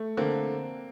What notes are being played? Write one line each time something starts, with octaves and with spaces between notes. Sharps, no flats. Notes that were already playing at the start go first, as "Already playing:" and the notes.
Already playing: A3
D3 A#3 C4